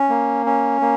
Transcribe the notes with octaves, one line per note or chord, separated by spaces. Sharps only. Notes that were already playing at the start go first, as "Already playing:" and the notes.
Already playing: C#4
A#3
C#4
A#3